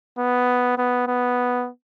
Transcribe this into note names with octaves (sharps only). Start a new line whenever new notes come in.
B3
B3
B3